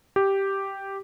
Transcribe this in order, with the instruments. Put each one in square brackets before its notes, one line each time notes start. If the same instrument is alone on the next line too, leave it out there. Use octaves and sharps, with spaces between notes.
[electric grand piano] G4